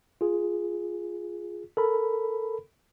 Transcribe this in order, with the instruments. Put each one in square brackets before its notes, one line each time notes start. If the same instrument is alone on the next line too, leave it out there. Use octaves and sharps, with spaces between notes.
[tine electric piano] F4 G#4
A4 A#4 B5